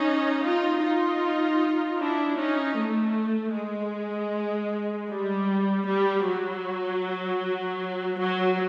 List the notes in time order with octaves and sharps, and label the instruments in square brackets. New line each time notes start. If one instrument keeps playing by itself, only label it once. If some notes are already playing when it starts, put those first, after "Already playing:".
Already playing: [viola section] C#4 D#4
D#4 F4
D#4 F4
D4 E4
C#4 D#4
A3
G#3
G3
G3
F#3
F#3